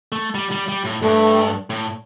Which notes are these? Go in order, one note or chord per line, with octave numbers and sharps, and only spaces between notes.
A3
G3
G3
G3
A2
G2 A3
A2